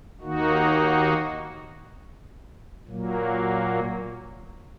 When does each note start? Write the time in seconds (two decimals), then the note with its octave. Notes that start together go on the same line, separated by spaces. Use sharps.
0.21 D#2 D#3 A#3 D#4 F#4
2.87 A#2 F#3 A#3